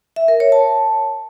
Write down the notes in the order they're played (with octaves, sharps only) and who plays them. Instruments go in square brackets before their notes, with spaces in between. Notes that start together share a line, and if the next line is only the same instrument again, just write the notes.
[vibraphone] E5
A#4
C#5
A5